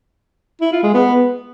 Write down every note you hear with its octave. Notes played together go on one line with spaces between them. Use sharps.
E4
F4
G#3
B3